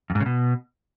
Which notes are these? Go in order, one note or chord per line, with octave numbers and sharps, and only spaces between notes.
F2
G#2
C#3
B2